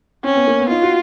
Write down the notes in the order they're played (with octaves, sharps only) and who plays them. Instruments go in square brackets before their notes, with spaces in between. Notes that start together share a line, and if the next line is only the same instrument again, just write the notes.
[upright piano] C4 [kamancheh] C#4
[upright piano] B3
A#3
B3
[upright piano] D#4 [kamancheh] F4
[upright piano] F#4